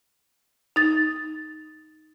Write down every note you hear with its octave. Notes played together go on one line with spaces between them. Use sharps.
D#4 A6